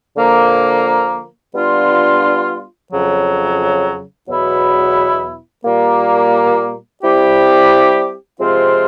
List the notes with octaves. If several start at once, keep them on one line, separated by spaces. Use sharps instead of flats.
D3 F3 A#3
G3 B3 D4 F4
F2 C#3 F#3
E2 B2 F#3 B3 E4
A#2 G3 A#3
G3 C4 E4 G4
C3 F3 G#3 C4 F4